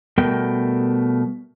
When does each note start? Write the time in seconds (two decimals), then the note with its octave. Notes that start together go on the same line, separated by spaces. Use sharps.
0.18 B2 G3 A3 B3 A#4 G5